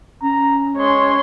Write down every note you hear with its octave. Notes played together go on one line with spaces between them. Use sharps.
C#4 A#5
G#3 C#5 C6